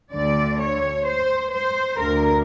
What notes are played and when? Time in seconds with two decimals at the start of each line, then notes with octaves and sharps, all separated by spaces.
0.13 D2 D3 D5
0.60 C#5
1.06 C5
1.52 C5
1.99 D2 D3 A#4